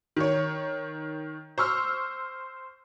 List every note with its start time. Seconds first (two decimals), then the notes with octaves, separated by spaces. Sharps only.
0.16 D#3 C#5
1.58 C5 C#6 E6 F6